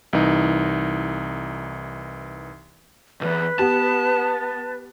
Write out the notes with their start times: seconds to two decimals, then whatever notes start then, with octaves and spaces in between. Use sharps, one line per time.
0.13 C2 E3 D#4
3.21 B1 E2 B4
3.59 B3 G4 A5